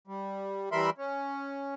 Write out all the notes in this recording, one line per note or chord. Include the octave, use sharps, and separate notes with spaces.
G3
E3 G3 A#4 E5 B5 C6
C#4